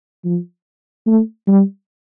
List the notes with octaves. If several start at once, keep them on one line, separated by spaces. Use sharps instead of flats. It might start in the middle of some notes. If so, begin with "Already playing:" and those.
F3
A3
G3